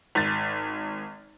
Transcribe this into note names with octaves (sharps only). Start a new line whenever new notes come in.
G#1 A6